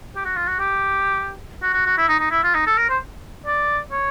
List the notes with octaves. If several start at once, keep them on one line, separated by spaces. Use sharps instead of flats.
G4
F#4
F4
F#4
G4
F#4
F#4
F#4
E4
D#4
D#4
E4
F4
D#4
A4
A#4
C5
D5
C#5